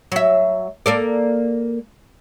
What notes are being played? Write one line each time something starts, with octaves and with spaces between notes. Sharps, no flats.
F#3 E5
A#3 A4 D5